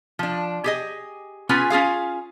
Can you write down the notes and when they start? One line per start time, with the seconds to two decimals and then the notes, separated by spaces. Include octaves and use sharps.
0.19 F3 D4
0.64 G4 G#4 D#5
1.49 B3 C#4 F4 G#4 B4 G#5
1.70 C#4 F4 G#4 F5